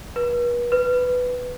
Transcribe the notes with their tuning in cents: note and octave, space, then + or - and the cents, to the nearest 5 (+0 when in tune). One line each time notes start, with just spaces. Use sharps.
B4 -40
B4 +10